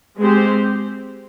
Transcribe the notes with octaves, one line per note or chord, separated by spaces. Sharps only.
G#3 C4 G4 C5